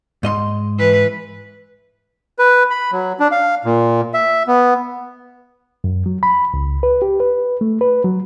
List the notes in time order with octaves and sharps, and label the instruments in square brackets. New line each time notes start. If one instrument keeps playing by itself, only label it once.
[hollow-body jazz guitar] G#2 D#5 C6
[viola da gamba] E3 B4
[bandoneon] B4
B5
F#3
D4
F5
A#2
E5
B3
[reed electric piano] F#2
F#3
B5
C#2
B4
G4
B4
A3
B4
F#3